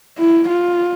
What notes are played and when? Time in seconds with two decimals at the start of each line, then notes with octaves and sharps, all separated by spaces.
0.18 E4
0.48 F4